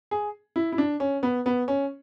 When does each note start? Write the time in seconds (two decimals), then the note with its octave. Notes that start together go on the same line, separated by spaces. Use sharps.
0.11 G#4
0.56 E4
0.72 E4
0.78 D4
1.00 C#4
1.23 B3
1.46 B3
1.68 C#4